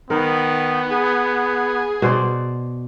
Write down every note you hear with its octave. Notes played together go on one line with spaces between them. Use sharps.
D#3 B3 A#4
G#4
B2 C5 D5